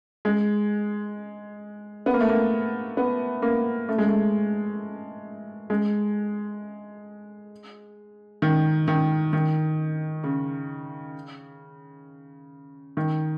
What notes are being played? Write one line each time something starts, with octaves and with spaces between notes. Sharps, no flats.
G#3
B3
A#3
A3
A#3
B3
A#3
A3
G#3
A3
G#3
D#3
D#3
D#3
C#3
D#3